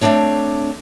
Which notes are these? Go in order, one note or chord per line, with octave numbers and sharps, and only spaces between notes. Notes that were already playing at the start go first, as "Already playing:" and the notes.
A3 A#3 C4 D4 C#5